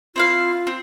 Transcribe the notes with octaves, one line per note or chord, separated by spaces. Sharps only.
C4 E4 F4 F5
C4